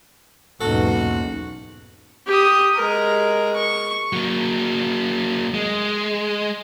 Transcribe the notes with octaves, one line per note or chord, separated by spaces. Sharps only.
B1 E2 G#2 A#3 C#4 D#4 F#4 A4
G4 D#6
G#3 A#4
C#6
F#3 A#3
G#3